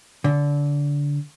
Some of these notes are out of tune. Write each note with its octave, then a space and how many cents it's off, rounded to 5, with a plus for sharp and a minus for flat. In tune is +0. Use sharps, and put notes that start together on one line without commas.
D3 -25